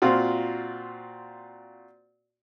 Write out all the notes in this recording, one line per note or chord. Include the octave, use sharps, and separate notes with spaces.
A#2 C4 F4 F#4